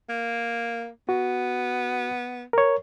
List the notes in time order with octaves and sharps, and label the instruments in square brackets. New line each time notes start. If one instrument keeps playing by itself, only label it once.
[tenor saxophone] A#3
[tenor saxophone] B3 [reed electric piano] F#4
[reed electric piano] A#4 C#5